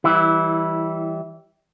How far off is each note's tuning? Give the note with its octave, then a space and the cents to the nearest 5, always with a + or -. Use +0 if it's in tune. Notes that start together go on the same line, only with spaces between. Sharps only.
E3 +0 G3 +0 E4 -20